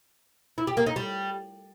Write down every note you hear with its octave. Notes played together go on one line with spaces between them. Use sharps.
E4
G4
A#3
D#4
G3